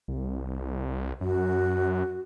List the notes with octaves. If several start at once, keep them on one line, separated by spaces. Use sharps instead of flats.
C2
F#2 F#4